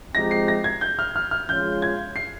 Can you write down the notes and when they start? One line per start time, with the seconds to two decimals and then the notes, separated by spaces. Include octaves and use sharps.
0.15 F3 G#3 C4 D#4 G4 A#6
0.31 C7
0.48 A#6
0.64 G#6
0.81 G6
0.99 F6
1.16 F6
1.31 F6
1.49 F3 G#3 C#4 F4 G6
1.82 G#6
2.16 C7